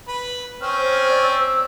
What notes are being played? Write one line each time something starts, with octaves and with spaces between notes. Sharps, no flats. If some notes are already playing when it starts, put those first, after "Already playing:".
B4
C4 C#4 F6
C5
D5
E6